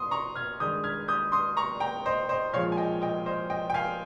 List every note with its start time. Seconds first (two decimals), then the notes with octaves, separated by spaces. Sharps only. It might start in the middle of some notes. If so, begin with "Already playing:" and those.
Already playing: C6 D#6
0.11 A#5 C#6
0.36 F6 G#6
0.60 G2 D#3 G#3 D#6 G6
0.84 F6 G#6
1.08 D#6 G6
1.32 C6 D#6
1.57 A#5 C#6
1.80 G5 A#5
2.06 C5 D#5
2.29 C5 D#5
2.53 A#2 F3 G#3 C#5 F5
2.72 G#5
2.77 D#5 G5
3.02 D#5 G5
3.26 C5 D#5
3.50 D#5 G5
3.70 G5
3.74 F5 G#5